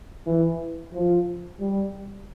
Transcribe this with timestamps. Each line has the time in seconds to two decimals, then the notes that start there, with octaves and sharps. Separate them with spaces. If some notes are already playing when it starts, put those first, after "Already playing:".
0.26 E3
0.93 F3
1.60 G3